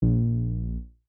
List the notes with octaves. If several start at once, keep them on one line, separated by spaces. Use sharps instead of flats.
A#1